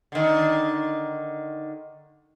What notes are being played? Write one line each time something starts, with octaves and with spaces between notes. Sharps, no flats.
D3 D#3